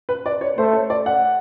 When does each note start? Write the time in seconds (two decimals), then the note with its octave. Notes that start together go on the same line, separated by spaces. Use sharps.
0.09 B4
0.26 D5
0.41 C#5
0.58 A3 C5
0.73 C#5
0.90 D5
1.06 F#5